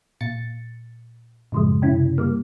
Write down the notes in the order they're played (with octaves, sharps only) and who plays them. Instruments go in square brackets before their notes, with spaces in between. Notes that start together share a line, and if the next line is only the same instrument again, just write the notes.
[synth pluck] A#2 A6 C#7
[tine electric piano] F#2 C#3 [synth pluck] A2 F3 G#3
[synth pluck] C3 C#4 E4
G3 A#3